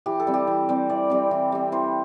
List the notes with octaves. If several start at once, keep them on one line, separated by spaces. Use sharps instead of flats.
E3 G4
A4
G3 C4
G4
E3
G3 C4
E3 D5
G3 C4
E3
G3 C4
E3 C5